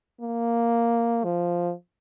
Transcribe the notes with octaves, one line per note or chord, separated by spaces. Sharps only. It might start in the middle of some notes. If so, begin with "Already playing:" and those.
A#3
F3